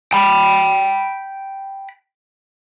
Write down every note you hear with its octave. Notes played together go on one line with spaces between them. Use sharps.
G5 B5